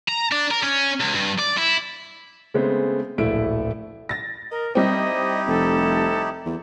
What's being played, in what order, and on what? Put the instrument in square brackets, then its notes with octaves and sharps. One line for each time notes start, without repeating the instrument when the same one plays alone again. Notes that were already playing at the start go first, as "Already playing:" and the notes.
[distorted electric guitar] A#5
D4
A#4
C#4
C#2
G2
D5
E4
[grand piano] C#3 G#3 A3 B3 C4
D1 A#1 A3 E4 E5 D7
[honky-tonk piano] A6 A#6
[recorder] A#4 [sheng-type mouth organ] D#5
[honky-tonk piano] G3 C4 [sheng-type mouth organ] D#4 E4 G4 [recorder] D#5
[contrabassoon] F1 [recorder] A4
[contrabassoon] E2